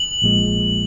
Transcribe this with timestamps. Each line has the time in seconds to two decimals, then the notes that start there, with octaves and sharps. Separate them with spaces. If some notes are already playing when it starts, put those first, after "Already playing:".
Already playing: F#7
0.22 A#1 A#2 G#3